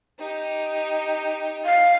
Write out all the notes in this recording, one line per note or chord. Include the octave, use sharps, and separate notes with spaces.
D#4 G4
F5